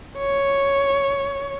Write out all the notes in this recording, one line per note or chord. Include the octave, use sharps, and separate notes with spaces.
C#5